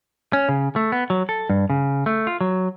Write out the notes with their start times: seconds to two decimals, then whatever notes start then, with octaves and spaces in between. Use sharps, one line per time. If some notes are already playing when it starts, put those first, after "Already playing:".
0.33 C#4
0.49 C#3
0.76 A3
0.92 B3
1.10 F#3
1.29 A4
1.50 G2
1.70 C#3
2.06 A3
2.27 F4
2.41 F#3